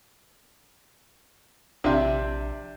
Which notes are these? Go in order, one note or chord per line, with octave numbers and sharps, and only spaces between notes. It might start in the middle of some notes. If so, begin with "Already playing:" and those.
A#1 C3 D4 E5